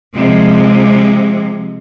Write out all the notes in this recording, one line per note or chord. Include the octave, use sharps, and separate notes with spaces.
C3 F3 G#3